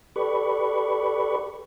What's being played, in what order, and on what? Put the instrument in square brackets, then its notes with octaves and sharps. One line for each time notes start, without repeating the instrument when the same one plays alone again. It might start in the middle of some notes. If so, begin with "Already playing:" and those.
[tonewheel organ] G4 A4 B4 D5 B5 C#6